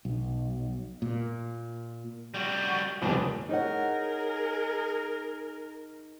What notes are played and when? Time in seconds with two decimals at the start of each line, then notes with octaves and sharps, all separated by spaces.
0.05 B1
1.02 A#2
2.34 G3 F#4
3.02 D#1 F2 G#2 D3
3.49 D#4 G#4 A#4 C#5 F#5